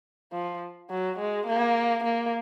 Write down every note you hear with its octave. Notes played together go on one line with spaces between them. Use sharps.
F3
F#3
G#3
A#3
A#3